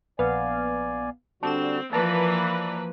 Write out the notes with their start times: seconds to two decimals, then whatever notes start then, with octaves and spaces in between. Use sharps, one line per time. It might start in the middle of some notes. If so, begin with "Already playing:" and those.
0.19 A#1 B3 D5 F5 G#5
1.43 D3 G3 C4 D4 F#4 E7
1.93 E3 F3 A#3 B4 D5 A5 A#5 D6